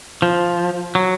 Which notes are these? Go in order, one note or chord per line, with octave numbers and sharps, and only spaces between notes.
F3
F#3